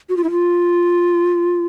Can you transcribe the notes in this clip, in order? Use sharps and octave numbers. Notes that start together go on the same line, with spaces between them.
F#4
F4
E4
F4